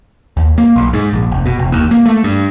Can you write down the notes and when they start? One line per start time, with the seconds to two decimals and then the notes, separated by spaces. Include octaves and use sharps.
0.37 D#2
0.58 A#3
0.76 B1
0.93 G#2
1.13 A#1
1.31 F1
1.46 B2
1.59 F1
1.72 D#2
1.91 A#3
2.06 A3
2.24 G2